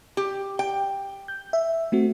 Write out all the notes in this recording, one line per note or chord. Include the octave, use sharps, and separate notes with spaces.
G4
G5
G6
E5
A3 C4 F#4